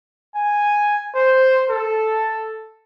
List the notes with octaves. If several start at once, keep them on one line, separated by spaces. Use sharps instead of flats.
G#5
C5
A4